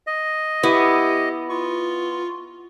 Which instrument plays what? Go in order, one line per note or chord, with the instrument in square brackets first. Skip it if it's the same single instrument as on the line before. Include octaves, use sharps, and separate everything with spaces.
[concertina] D#5
[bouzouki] B3 [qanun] E4 [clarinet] G4
[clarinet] F4 [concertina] C#6